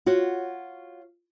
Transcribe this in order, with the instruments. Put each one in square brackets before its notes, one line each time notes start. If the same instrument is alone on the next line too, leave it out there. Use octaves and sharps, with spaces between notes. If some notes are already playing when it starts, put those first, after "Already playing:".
[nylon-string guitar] F4 F#4 C#5 F#5